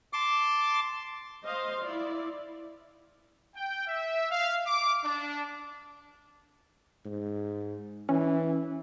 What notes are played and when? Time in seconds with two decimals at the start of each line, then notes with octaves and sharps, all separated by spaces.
0.13 A5 C6 D6 A6
1.44 C5 D#5 F5 C6
1.83 E4 D5
3.55 G5
3.88 E5
4.30 F5
4.66 D6
5.03 D4
7.05 G#2
8.09 E3 C#4